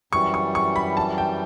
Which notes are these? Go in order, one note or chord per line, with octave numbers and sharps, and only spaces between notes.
F#2 E3 G3 C#6
C#6
C#6
B5
A5
G5